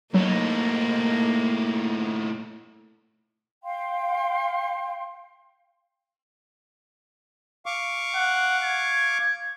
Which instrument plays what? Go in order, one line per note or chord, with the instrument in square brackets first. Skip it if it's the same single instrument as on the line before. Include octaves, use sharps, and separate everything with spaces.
[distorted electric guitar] A2 D#4 [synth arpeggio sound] F#3 [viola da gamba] A#3
[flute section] F5 G5 C6
[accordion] F5 C#6 D6
[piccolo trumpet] F#5
G#6